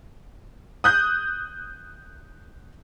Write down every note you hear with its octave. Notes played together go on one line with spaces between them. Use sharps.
D#6 F#6 G6